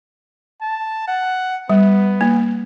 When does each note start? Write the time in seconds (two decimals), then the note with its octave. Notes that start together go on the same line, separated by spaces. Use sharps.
0.61 A5
1.08 F#5
1.69 G3 B3
2.21 A#3